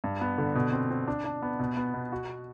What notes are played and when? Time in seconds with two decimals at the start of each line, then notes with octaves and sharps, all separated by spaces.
0.04 G2
0.21 B3
0.38 D3
0.55 B2
0.73 C4
0.90 C4
1.07 D4
1.25 D4
1.42 B3
1.59 B2
1.77 B3
1.94 B2
2.12 F#4